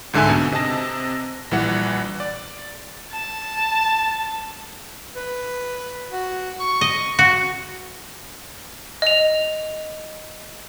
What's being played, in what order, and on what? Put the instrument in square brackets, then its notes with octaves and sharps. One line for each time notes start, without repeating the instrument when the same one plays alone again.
[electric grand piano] C2 G#2 D3 D4 E5 G#5
B2
C3 D#5 A5 A#6
A#1 E3 G3 F#5
D5
[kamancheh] A5
[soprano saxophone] B4
F#4
C#6
[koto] D#5
F#4
[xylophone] D#5 F7